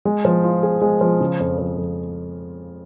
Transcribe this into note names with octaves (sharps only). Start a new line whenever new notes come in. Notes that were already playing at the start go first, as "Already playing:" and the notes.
G#3
F3
F4
G#4
G#3
F3
C#3
F2
F3
F2